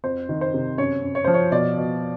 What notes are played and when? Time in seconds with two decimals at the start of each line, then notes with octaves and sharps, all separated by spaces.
0.04 F2 C5
0.29 D#3
0.41 C5
0.54 C3
0.78 F#2 C#5
1.03 F#2
1.15 C#5
1.24 F3 C5
1.34 C#5
1.52 B2 D5
1.77 B2